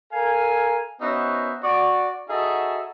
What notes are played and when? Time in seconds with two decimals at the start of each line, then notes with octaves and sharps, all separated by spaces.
0.12 A4 A#4 F5 G#5
1.01 B3 C#4 D#4 F#4 C5 E5
1.63 F#4 D5
2.29 D#4 F#4 G#4 A4 D#5 E5